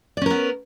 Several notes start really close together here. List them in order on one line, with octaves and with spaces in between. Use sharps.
D5 C#4 A#4 B3